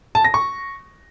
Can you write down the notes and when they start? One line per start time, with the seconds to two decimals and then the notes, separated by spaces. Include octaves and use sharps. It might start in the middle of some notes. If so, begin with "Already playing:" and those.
0.15 A5
0.24 A#6
0.34 C#6